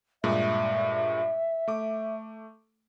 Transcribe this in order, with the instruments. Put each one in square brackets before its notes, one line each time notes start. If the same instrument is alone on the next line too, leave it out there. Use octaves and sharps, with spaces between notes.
[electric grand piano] G2 A#2 G#3 [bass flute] E5
[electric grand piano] A3 D6